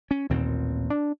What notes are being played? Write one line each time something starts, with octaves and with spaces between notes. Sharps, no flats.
C#4
A1 D#2 A#2 C4
D4